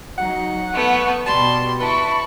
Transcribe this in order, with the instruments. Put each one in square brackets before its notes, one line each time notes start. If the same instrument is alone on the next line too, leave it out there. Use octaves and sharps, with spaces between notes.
[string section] F#3 D#4 [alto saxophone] F#5
[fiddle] A3 B3 [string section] C#6
[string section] B2 G3 [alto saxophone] A5 [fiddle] C6
[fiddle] E4 [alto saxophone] B4 [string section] A5 B5 C#6